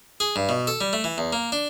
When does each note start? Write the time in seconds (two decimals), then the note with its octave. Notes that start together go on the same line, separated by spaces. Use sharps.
0.20 G#4
0.36 G2
0.49 B2
0.67 A4
0.81 G3
0.93 A3
1.04 E3
1.18 E2
1.33 A#3
1.52 D4